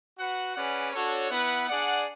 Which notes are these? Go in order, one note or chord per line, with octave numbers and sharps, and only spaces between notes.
F#4 B4 F#5
C#4 G#4 B4 D5 F#5
D4 F#4 A4 C#5
B3 E4 B4 F#5
D4 G#4 D5 F#5